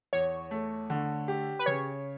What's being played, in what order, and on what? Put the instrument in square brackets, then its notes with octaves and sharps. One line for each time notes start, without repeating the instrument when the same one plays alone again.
[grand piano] E2 [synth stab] C#5
[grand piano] A3
D3
G4
[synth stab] B4
[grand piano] C#3 [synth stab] C#5